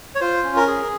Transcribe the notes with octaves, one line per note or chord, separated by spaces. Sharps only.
C#5
F4 C5
C#4
A#4
G#4